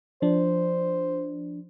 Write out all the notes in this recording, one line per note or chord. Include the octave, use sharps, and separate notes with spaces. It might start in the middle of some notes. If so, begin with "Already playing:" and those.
F3 D4 C5